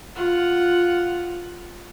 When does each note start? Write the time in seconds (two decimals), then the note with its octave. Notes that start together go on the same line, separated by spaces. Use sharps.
0.16 F4 F#5